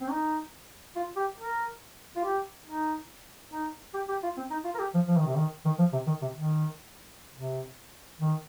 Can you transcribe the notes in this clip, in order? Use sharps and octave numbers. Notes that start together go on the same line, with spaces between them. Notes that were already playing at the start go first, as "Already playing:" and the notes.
C4
D#4
F4
G4
A#4
F4
G4
D#4
D#4
G4
G4
F4
C4
D#4
F4
A#4
G4
F3
F3
D#3
C3
D#3
D#3
F3
C3
D#3
C3
D#3
C3
D#3